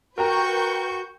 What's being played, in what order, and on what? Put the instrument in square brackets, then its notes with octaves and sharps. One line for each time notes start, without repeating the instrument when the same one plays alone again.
[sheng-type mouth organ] F#4 [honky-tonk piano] A#4 G5 A#5 [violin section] B4 C#6 G6